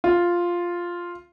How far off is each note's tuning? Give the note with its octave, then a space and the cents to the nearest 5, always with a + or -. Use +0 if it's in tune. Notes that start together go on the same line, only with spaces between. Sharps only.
F4 +0